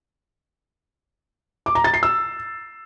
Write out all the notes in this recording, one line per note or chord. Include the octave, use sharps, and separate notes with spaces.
D6
A#5
A6
C7
E6